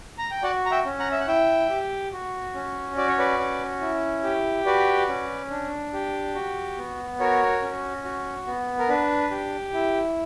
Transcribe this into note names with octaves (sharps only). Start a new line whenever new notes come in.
A#5
G5
F#4 D5 F#5
A#5
E5 G5
C#4
F#5 A#5
E5
F#5
E4 E5 G5
G4
F#4
C#4
F#4 D5
C#5
B4 D5
C#4
E4
G4
F#4 B4 D5
C#4
D4
G4
F#4
B3
F#4 A#4 C#5
C#4
F#4
B3
A#4
D4 B4
G4
E4